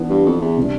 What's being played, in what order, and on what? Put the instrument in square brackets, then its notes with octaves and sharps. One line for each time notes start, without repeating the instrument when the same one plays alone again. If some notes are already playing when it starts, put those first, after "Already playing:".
Already playing: [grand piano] E3 B3 D4
[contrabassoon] G2
F2
E2
[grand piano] C3 G3 D4